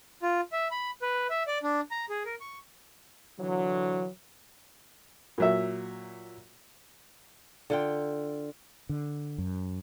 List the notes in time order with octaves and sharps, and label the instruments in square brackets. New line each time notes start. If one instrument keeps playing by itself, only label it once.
[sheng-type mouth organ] F4
E5
B5
B4
E5
D5
D4
A#5
G#4
A#4
C#6
[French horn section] D3 E3 F#3
[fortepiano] A#2 F#3 E5
[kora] D3 F4 G5
[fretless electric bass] D3
F#2